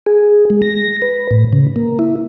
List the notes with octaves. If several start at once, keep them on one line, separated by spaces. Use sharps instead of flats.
G#4
G#3
A#6
B4
A2
C#3
A#3
E4